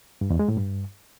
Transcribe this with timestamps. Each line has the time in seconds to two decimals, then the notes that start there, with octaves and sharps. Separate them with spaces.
0.21 G2
0.30 E2
0.39 G#3
0.48 A2
0.57 G2